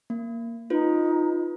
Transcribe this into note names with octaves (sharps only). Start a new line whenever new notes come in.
A#3
D#4 F4 B4